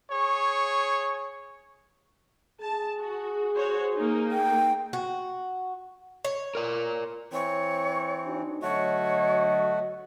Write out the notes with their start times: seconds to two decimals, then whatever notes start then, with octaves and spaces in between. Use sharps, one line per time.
0.11 G#4 C#5 C#6
2.61 G#4 A5
2.98 F#4
3.56 F#4 C5 C#5
3.94 A#3 D#4
4.31 G5
4.93 F#4
6.25 C#5
6.55 A#4 D5
7.32 E3 C4 C#5
8.26 D4 D#4 F#4
8.62 D3 F#3 A3 F#4 C#5 D#5